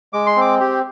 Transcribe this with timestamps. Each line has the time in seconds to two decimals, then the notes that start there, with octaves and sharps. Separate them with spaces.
0.13 G#3 D6
0.27 C6
0.36 C4 D6
0.60 G4